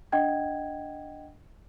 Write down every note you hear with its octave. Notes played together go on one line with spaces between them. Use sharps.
D4 D#5 F#5 G5 G#6